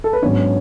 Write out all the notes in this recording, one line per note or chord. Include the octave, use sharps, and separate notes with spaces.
A4
B4
G#2 F#3 B3 C#4 D4 C#5